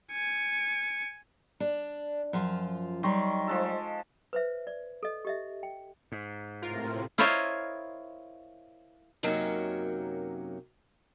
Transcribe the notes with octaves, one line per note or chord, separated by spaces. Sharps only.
G#5 C#7
D4
F#2 F3 F4
D#3 F#3 G3 C6 C#6
F3 G#3 A4
B4 C5 E5
D5
A4 D#5
G4 D#5 E5
G5
G#2
A2 C3 F4 A#4
E4 F4 A#4 C5 C#5 D#5
F#2 C3 F#3 A#3 C#4 D#4